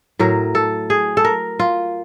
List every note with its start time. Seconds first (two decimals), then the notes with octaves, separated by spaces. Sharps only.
0.19 A2 F#3 A#4
0.55 A4
0.90 G#4
1.17 A4
1.24 A#4
1.59 F4